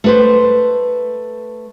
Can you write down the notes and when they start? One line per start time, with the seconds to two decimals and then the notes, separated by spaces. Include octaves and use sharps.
0.04 A3 B4 C5